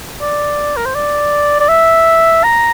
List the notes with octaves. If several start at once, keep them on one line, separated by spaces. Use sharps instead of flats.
D5
A#4
C5
D5
D5
E5
A#5